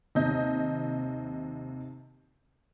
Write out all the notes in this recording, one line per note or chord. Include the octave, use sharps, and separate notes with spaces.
D#2 C3 D#5 G6